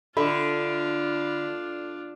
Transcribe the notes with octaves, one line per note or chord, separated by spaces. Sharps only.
D3 D4 F4 A4 E5 B5